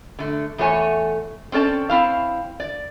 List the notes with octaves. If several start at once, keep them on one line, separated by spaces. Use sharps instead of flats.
D3 A3
E2 A3 F#4 C#5 G#5
C4 C#4 A4 D5 A5
C4 E4 F5
D5